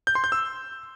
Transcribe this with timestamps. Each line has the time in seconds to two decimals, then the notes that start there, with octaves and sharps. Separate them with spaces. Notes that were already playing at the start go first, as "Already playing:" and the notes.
0.07 G6
0.15 C6
0.24 G6
0.32 E6